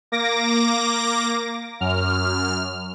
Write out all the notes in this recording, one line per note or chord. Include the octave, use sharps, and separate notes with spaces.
A#3 D6 A#6
F#2 F6